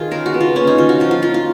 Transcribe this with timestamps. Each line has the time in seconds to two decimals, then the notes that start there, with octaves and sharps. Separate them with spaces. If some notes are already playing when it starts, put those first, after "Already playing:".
Already playing: D#3 F4 G#4
0.11 C#3 A#4
0.26 F#4
0.34 B3
0.40 F4
0.55 A#3 C#4
0.67 D#4
0.78 D#3 F4
0.89 F#4
1.00 F3 F4
1.11 F4
1.22 F3 F4
1.34 F4